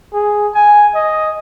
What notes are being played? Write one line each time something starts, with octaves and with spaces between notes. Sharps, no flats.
G#4
G#5
D#5